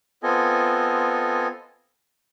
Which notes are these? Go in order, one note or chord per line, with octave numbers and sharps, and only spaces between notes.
B3 C4 F4 A4 D#5 G#5